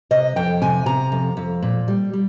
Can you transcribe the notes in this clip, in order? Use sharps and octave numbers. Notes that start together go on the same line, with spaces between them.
C3 D#5
F2 G5
C3 G#5
C3 A#5
F2
F2
A#2
G3
G3